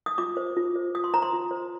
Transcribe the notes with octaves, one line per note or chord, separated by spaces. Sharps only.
D#6
F4 D6
C5
F4
C5
F4 D#6
C6
C5 A#5
C6
F4
C5